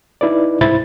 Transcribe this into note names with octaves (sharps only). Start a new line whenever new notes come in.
D#4 E4 B4 D5
C2 G#2 E4 C5 B5 A6